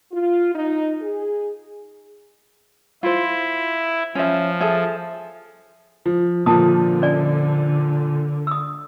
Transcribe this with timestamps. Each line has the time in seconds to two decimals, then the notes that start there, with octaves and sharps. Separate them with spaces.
0.12 F4
0.54 D#4
1.01 G#4
3.03 E4 F4 C5
4.15 F3 C#4 E5
4.60 G#4 A4 E5
6.06 F3
6.46 A#2 D3 F3 A5 D#6
7.02 C#4 D5 G#5
8.47 D#6 E6